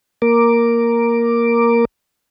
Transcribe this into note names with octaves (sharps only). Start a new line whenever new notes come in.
A#3 A#4 D6